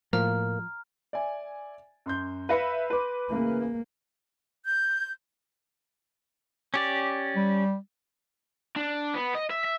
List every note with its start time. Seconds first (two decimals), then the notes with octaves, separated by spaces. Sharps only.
0.13 A2 F3 A#3 A#5 F6
1.13 D5 E5 G#5
2.06 F#2 C6 G6
2.49 B4 E5 F5 B5 A#6 C#7
2.90 B4 C6 D6
3.30 C#3 E3 A#3
4.65 G6
6.74 C#4 G4 D5
7.37 G3
8.76 D4
9.14 B3
9.35 D#5
9.50 E5
9.64 E5